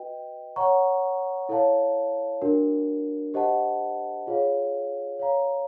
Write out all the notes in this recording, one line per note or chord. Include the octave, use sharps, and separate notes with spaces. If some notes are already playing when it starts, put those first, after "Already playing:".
Already playing: F#4 B4 D#5 G5
C#5 F#5 A#5 C#6
E4 A4 C#5 F5 A5
D4 F#4 A#4
G4 C5 D#5 F#5 A5
F4 G#4 C#5 F5
C#5 F5 A#5